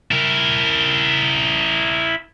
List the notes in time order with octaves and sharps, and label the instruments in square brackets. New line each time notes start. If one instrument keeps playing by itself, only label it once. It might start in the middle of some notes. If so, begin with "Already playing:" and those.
[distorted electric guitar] E4 A#4